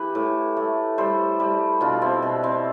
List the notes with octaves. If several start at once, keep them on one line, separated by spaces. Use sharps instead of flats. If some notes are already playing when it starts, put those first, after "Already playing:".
Already playing: E3 E4 G4 B4
A2
A3
G3 A4 C5
G3
B2 D4 F4
C4 E4
B2
C4 E4